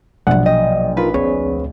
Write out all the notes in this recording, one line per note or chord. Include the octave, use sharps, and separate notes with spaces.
A#1 G#2 B2 F#3 F#5
D#5 G5
D#4 F4 A#4 B4
D2 C4 G#4 C#5